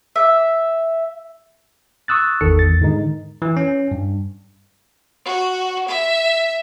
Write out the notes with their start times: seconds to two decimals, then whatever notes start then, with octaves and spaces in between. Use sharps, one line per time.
0.16 E5
2.08 C#6 D#6 E6 F#6 A6
2.41 G#1 E2 D#3 A4 C#7
2.59 E2 A6
2.81 G#2 D3 D#3 G#3 D#4
3.42 E3
3.57 C#4
3.91 G2
5.25 F#4
5.89 E5